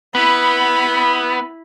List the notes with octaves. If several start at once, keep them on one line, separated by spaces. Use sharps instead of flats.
B3 E4 B5